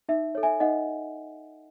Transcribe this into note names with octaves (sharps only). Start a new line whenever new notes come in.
D#4 E5
A4 C#5
E5 G#5
D#4 D#5 F#5